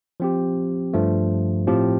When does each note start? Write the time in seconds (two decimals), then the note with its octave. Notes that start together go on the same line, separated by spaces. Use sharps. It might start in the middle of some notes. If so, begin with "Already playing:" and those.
0.20 F3 C4 G4
0.93 G2 F3 A3
1.67 A2 F3 C4 G4